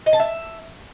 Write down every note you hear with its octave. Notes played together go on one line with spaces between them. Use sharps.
D#5
A5
E5